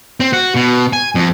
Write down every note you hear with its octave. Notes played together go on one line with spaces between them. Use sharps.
C4
F#4
B2
G#5
F2